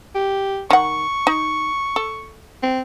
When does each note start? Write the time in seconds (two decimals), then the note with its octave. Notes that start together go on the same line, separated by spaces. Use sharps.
0.15 G4
0.70 D#3 F#5 C#6
1.27 D#4
1.96 A4
2.63 C4